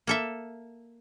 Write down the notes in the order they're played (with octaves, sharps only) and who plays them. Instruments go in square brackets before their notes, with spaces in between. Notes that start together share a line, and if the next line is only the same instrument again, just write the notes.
[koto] A#3 A4 E5